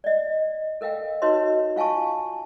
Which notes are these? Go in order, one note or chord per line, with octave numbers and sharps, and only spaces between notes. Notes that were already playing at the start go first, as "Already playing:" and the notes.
D5 D#5
A4 A#4 D#5 F5 G5
D#4 F#4 B4 C#5 D#5 C6
F4 F5 G#5 A5 C#6